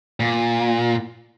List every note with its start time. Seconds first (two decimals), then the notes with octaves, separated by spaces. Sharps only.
0.20 A#2